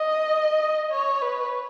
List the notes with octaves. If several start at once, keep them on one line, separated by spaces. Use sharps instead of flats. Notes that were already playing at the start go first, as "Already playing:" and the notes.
Already playing: D#5
C#5
B4